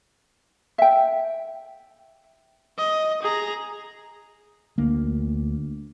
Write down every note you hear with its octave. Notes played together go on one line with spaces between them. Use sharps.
E5 G5
D#5
G#4 A#5
D2 A#3